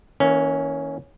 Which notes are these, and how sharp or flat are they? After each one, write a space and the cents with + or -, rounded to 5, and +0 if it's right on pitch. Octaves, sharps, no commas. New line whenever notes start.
E3 -40 A#3 +0 C#4 +0